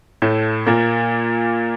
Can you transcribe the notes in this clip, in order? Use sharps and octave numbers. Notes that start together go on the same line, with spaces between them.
A2 A3
A#2 A#3